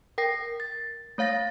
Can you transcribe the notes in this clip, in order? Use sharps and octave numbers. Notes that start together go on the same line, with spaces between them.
A#4 G5 A#6 C7
A6
A3 C#5 F5 A6 A#6